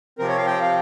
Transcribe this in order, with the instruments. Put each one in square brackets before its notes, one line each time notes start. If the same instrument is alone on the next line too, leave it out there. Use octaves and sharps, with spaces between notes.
[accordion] C3 F3 C4 A#4
C#5
F5
G5
F5